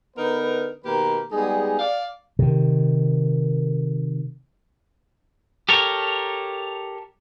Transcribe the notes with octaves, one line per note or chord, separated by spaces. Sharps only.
D3 B3 D#4 A#4 B4
B2 D#3 A#3 G4 B4 A#5
G3 G#3 B3 D#4 G#4
D5 F5
C3 D#3
G4 A4 A#4 C#5